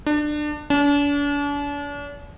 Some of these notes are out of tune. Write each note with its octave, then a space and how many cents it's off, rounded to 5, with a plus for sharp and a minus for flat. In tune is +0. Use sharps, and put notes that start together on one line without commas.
D4 +25
D4 -40